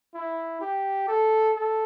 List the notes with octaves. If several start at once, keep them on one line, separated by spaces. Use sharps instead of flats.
E4
G4
A4
A4